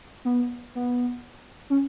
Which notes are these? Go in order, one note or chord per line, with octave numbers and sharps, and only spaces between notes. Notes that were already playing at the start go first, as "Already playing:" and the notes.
B3
B3
C#4